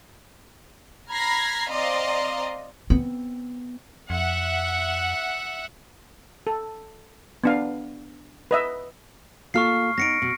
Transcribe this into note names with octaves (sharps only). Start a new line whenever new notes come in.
A#5 B5 F6 G#6 A#6 C7
C4 D5 D#5 F5 A#5 C6
B3 C4
F2 E5 F#5
A4
B3 D4 F5
B4 D#5 E5
A#3 F4 A4 C#6 F6 C7
B3 D4 D#4 A#6 C#7 D7
B2